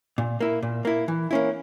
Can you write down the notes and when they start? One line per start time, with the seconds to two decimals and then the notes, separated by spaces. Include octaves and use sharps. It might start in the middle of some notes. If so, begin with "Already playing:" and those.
0.18 A#2
0.40 A#3 E4
0.63 A#2
0.85 A#3 E4
1.08 E3
1.31 A#3 C#4 E4